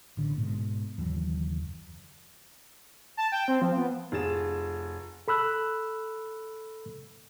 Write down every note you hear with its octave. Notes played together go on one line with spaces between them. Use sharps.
A1 D3
G#2 B2
F#1 D#2 E3 F#3
A5
G5
C4
F3
B3
F1 F4 G#4 A6 E7
A4 B5 E6 F#6